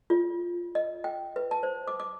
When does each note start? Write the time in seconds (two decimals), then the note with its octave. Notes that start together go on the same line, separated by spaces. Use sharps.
0.10 F4
0.75 D#5
1.04 G5
1.36 B4
1.51 A5
1.63 C5
1.87 D6
2.00 D6